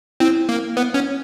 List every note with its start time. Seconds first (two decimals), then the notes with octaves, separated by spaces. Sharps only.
0.20 C4 E4
0.49 A#3
0.77 B3
0.94 C#4